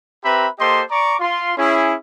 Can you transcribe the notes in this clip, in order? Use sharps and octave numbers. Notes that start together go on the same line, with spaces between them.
C4 G4 B4 E5 A#5 B5
A#3 G4 A4 C5 D#5 C6
D5 A#5 C#6 D6
F4 C6
C#4 E4 G#4